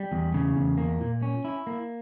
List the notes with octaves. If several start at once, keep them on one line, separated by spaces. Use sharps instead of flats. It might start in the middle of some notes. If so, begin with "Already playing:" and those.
Already playing: G3
E2
C#3
E2
A#3
A#2
C#4
E4
A#3